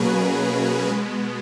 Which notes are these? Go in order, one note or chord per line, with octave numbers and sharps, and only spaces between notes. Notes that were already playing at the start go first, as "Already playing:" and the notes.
Already playing: B2 F#3 A#3 C#4 G#4 B4
B2 G#3 B3